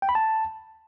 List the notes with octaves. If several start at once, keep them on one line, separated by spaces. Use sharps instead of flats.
G5
B5
A5